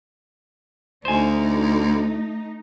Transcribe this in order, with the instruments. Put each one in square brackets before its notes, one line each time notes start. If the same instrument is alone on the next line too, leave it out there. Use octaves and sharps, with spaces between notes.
[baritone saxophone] D2 [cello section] A3 D#4 [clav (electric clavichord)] C5 G#5